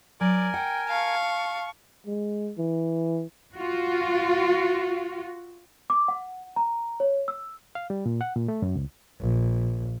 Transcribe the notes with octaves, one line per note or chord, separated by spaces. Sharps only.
F#3 A#4 D5 G#5
F#5 G5
F5 A5 C#6
G#3
E3
F4 F#4
D6
F#5
A#5
C#5
E6
F5
G3
A#2
F#5
A#2
A3
F#2
C#2
A#1